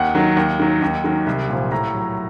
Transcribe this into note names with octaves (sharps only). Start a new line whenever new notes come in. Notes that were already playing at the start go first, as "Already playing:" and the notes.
Already playing: D#2 F#5
D#3 F#3
D#2
D#3 F#3
D#2
D#3 F#3
C2
A#2 F3
A2 A#5
F#3